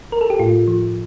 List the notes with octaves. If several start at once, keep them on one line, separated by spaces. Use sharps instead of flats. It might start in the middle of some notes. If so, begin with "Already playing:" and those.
A#4
A4
G4
A2 F4
F3